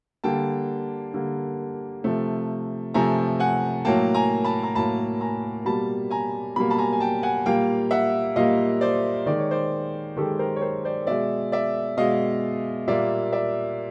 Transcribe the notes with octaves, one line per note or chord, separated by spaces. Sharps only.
D3 G3 A#3 G5 A5
D3 G3 A#3
C3 F3 A3
C3 F3 A3 G#5 A#5
F#5 G#5
A2 F#3 A#3 G5 A5
G#5 A#5
A5 B5
A#5
A2 F#3 A#3 A5 B5
G#5 A#5
B2 G3 A#3 A5 B5
G#5 A#5
B2 G3 A#3 B5
A5 B5
G#5 A#5
G#5
G5 A5
F#5 G#5
A#2 G3 A#3 F5 G5
E5 F#5
A#2 G3 A#3 D#5 F5
C5 D5
D#3 G#3 D5
C#5
C5 D5
D#3 G#3 G4 A4
A#4 C5
C#5
A#4 C5
C5 D5
B2 G#3 D5 E5
D5 E5
B2 G#3 D#5 F5
A#2 G3 A#3 D5 E5
D5 E5